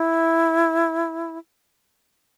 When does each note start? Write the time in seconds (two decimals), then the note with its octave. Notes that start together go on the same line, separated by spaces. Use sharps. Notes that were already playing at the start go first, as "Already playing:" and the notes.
Already playing: E4